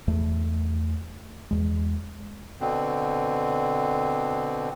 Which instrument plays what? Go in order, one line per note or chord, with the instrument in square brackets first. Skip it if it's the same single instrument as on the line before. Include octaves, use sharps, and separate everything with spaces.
[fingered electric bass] E2 A3
E2 G#3
[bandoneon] B2 D3 C4